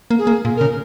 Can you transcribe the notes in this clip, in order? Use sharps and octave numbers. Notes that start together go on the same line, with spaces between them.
A#3
G#4
A#3
A#2
A#4
C#3